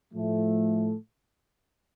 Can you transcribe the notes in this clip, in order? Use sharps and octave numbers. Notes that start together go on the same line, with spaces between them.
A2 F3 A3